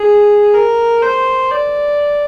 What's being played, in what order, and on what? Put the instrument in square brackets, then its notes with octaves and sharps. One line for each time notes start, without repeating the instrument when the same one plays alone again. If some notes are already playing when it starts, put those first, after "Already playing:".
Already playing: [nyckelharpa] G#4
A#4
C5
D5